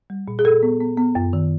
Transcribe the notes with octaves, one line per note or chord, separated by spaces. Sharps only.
G3
A#2
G#4
A#2 A4
B3
B3
B3
F#2
D#3